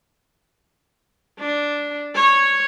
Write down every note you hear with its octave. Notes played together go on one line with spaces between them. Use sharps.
D4
C#5